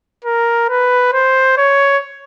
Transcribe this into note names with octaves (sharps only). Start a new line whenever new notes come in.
A#4
B4
C5
C#5